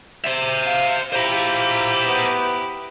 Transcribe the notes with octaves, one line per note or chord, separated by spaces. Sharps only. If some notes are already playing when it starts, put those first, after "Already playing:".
C5 E5
F5
E4 F4 G4 C5 A#5
B3